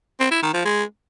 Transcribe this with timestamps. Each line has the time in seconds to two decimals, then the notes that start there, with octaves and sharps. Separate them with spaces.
0.20 C4
0.31 E4
0.42 D#3
0.54 F3
0.65 G#3